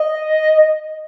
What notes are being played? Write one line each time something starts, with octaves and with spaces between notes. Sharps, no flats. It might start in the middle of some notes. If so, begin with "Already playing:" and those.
Already playing: D#5